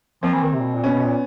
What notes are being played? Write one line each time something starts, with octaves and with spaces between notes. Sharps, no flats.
F3 A#3 C4
E3
D#3
C3
A#2
B2
A#2
B2 B3 C#4
B2
A#2